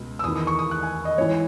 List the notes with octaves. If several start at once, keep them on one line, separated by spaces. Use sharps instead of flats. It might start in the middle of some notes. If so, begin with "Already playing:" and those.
Already playing: C#2 B2
E6
E2 D#3 D#6
D#6
C#6
D#6
F#6
G#5
D#5
G#2 E3 C#5